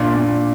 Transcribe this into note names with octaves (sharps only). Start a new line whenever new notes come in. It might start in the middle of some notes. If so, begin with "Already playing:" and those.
Already playing: A#2 D4
A#2